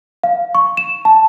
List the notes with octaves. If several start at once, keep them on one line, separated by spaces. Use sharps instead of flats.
F5
C#6
E7
A5